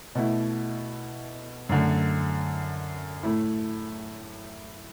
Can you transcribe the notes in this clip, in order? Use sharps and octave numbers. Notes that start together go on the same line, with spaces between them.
B2 A3 E4
F#2 D3 A3
A2 A3 E4